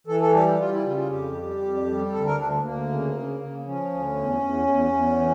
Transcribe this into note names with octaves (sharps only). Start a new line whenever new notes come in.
E3 A4
A4
G3 G4
G3 F4
E4
C#3 F4
F4
F2 G4
G3
F2
G3
D2 A4
A#4
D2 D4
D2 A#3
C#3
C#3
C#3
F3 C#4
D2
E2
E2
E2
E2
E3